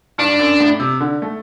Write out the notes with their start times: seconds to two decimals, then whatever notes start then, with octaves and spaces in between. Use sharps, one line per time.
0.18 G2 D4
0.39 F#2
0.60 A2
0.80 C3
1.00 D3
1.22 A3